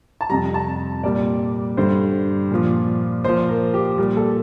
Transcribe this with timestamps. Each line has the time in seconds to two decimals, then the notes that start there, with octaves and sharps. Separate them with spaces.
0.21 A5
0.29 F2 C3 G3 A#5
0.54 A5
1.03 A#2 G3 D5
1.77 G2 D3 G3 C5
2.51 A#2 F3
3.24 A#2 C5
3.28 F3
3.49 A#4
3.74 G4
3.98 A#2 G3
4.17 A4